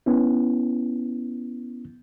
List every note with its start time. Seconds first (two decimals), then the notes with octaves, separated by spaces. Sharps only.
0.06 B3 C#4 E4